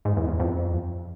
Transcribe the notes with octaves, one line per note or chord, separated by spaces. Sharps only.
G#2
E2
E2
F2